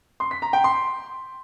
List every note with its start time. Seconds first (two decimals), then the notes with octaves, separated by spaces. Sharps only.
0.20 C6
0.31 B6
0.42 A#5
0.53 G5
0.64 C6